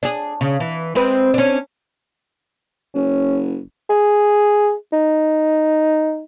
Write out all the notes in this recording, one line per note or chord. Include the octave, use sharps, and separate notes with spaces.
D4 G#4
C#3
E3
G#3 C4 B4
C#4 D4
F#1 C#4
G#4
D#4